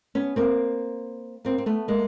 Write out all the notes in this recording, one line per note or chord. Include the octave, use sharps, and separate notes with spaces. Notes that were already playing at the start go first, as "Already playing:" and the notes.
B3 C#4
A#3 C4
A#3 C4
C4
A3 B3
G#3 A#3